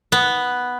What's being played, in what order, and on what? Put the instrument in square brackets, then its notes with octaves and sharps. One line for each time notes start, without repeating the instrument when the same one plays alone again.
[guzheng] B3